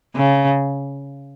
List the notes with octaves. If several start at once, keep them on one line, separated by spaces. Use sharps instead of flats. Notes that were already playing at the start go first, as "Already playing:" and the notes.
C#3